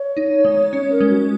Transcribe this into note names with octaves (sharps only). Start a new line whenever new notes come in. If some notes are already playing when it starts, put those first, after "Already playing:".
Already playing: C#5
D#4
G#3
C#4 C#5
A#4
G#3
F#4